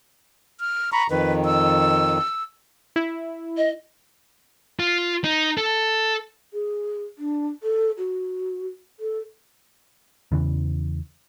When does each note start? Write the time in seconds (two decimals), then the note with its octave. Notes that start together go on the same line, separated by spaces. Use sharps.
0.60 F6
0.92 A#5 B5 C#6
1.10 F2 D#3 B4
1.45 E6
2.96 E4
3.57 D#5
4.80 F4
5.24 D#4
5.58 A4
6.53 G#4
7.18 D4
7.63 A4
7.98 F#4
9.00 A4
10.32 E2 C#3 E3